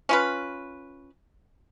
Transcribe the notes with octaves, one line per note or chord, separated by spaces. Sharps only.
C#4 F4 B4